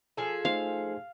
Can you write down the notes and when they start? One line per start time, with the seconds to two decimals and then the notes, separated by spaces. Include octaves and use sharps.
0.17 F3 G#4 A4
0.45 A3 D#4 C5 F5